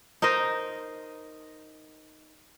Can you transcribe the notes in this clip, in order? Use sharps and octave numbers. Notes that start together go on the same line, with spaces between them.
D#4 A#4 C5 D#5